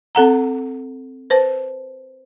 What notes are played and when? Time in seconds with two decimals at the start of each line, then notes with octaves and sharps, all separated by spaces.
0.15 C4 A4 F#5 A#5
1.30 B4 C5 A5